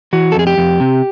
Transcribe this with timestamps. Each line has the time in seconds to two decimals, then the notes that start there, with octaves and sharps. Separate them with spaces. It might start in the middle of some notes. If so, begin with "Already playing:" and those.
0.13 E3 F#4
0.32 A4
0.36 F2 G#4
0.47 G4
0.58 F2
0.80 C3